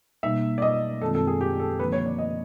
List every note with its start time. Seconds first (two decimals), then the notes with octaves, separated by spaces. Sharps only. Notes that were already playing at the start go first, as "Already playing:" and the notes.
0.23 B2 G3 A#3 D#4 E5
0.58 D5
0.62 D#5
1.01 F#2 D#3 G#3 C4 F4 A4
1.15 A4
1.27 G#4
1.41 G4
1.60 A4
1.79 D3 F3 A#3 D4 B4
1.92 C#5
2.06 D5
2.18 D#5